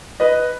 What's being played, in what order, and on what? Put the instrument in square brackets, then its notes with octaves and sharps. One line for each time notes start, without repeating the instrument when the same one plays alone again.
[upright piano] B4 D#5